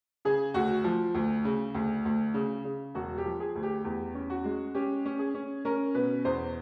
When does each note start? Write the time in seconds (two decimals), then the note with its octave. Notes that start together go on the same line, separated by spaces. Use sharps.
0.25 C#3 G#4
0.54 D2 F#4
0.84 F3
1.15 D2
1.45 C#3
1.74 D2
2.05 D2
2.34 C#3
2.65 C#3
2.95 E1 F#4
3.18 G4
3.24 F3
3.40 G#4
3.55 D2
3.63 G4
3.85 E2 G4
4.14 C#4
4.30 F#4
4.44 G#3
4.75 C#4 G4
5.05 C#4
5.19 G#4
5.34 C#4
5.65 C#4 A#4
5.95 B2 B4
6.25 E2 C5